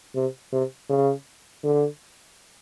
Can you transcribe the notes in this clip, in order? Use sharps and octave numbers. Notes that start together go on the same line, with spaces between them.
C3
C3
C#3
D3